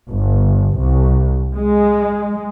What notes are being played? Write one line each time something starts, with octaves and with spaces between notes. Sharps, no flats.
G1
C2
G#3